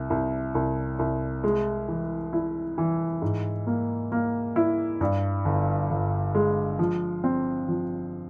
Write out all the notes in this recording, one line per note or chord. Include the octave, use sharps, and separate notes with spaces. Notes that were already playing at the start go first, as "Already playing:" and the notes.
Already playing: C2
C2
C2
C2
G#3
E3
E4
E3
G#2
A#3
A#3
E4
G2
G1
G1
G#3
F3
C4
F3